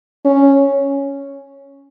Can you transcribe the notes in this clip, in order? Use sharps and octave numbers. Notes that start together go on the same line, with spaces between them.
C#4